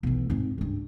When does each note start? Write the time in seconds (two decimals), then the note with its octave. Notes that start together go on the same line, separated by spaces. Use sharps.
0.03 B1 E3
0.30 G#2 C4
0.58 C#2 G2